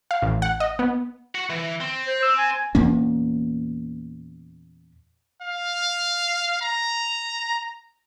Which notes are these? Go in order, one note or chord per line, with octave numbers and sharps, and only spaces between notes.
F5
A1
F#5
D#5
B3
F#4 F#5
E3
C4
C5
E6
G#5
E2 A#2 A#3 C#4
F5
A#5